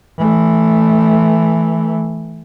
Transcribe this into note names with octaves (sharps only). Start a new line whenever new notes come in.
E3 A3